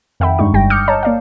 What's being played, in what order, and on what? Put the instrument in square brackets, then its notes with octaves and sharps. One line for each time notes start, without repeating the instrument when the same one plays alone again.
[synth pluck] F2 D#3 E5 F#5 G5 B5
G2 G#3 D4 D#4 C#6
G1 G2 G3 G5 A#6
D6 D#6 F6 G6 C#7
C#5 D#5 A5 A#5
A#3 D5 F5